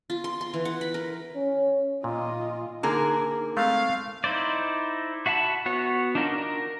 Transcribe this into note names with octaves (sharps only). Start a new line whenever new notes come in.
F4
C6
C6
E3
F#5
B5
A#4
C#4
A#2 F4 D#5
D3 A#3 D#4 G#4 A#4
G#3 A3 C4 F5
D#4 E4 C5 D5
F#4 E5 F#5 A5 B5
B3 F#4 C#5
D4 D#4 F4 F#4 A#4
A#4